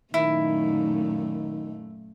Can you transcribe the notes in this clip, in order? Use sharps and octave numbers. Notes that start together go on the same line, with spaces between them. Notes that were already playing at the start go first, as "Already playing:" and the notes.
F#2 A#2 D#3 A3 E4